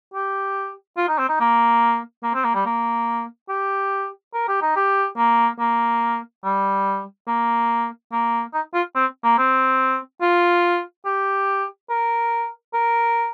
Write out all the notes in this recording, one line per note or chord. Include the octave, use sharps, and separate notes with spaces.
G4
F4
D#4
C4
D#4
A#3
A#3
C4
A#3
G3
A#3
G4
A#4
G4
D#4
G4
A#3
A#3
G3
A#3
A#3
D#4
F4
C4
A#3
C4
F4
G4
A#4
A#4